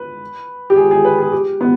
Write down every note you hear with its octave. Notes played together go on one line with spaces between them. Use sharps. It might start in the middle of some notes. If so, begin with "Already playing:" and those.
Already playing: B4
G4
G#4
G#4
B4
G#4
G4
B3